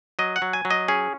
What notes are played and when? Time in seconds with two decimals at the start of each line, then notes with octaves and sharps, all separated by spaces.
0.19 F#3 D#5
0.36 F#5
0.42 F#3
0.53 G#5
0.65 F#3
0.71 D#5
0.88 C#4 G#4